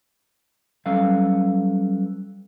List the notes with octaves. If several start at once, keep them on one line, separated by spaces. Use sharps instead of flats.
F#3 G3 C#4 A4 B4 F5